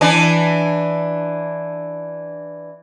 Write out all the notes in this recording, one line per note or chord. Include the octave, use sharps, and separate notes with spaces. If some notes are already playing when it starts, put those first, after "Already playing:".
E3 D4